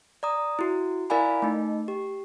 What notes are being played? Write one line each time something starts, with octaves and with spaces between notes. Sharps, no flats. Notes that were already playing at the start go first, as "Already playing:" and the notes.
D5 A#5 D#6
E4 F#4
E4 A#4 D5 F5 G#5 B5
A3 D#4
G4